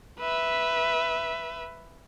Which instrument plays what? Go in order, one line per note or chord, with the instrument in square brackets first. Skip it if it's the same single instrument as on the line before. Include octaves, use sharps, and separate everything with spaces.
[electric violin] B4 E5